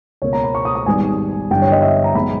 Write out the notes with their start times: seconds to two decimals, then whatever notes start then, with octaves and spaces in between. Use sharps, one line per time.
0.22 C#2 B2 A#3 C#5
0.33 A#5
0.44 B5
0.55 C#6
0.65 D#6
0.75 D#6
0.86 G#1 G#2 G3 B3 G#5
1.50 G1 G2 E3 G5
1.62 C#5
1.72 D#5
1.82 E5
2.04 A#5
2.15 B1 B2 G#3 B3 B5